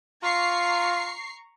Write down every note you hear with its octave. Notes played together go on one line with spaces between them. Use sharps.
F4 A#5 C#6 C7